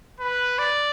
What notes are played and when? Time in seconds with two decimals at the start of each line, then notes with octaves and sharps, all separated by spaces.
0.20 B4
0.59 D5